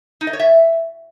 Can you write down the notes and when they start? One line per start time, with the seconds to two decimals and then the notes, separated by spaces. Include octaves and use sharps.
0.21 D#4
0.27 D#5
0.33 C#5
0.40 E5